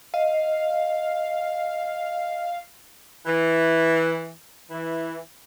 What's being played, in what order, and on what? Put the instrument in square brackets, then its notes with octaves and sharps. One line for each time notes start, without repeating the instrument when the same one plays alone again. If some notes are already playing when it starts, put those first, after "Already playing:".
[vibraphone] D#5 [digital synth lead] F5
[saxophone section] E3
E3